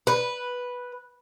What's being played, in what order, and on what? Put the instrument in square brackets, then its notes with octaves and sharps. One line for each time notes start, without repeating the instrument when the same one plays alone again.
[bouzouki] B4